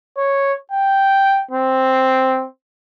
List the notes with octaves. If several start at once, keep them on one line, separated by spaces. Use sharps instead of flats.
C#5
G5
C4